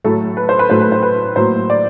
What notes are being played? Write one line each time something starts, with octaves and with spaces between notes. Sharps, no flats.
A2 F#3 A3 A4
B4
C5
B4
A2 F#3 A3 C5
B4
C5
B4
A2 F#3 A#3 C5
D5